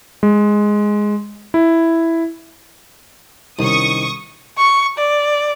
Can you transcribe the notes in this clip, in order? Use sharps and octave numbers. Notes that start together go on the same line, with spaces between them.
G#3
E4
C2 D#3 C#4 C#6 D#6
C#6
D5